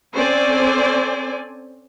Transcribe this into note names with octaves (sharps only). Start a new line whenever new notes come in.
C4 C#4 A4 C5 D5 G#5